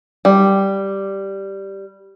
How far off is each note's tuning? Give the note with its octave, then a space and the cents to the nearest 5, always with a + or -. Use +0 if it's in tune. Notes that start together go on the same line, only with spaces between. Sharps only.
G3 -5